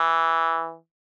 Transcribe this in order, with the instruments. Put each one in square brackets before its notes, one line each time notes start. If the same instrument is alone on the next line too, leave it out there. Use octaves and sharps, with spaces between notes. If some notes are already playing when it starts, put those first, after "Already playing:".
Already playing: [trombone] E3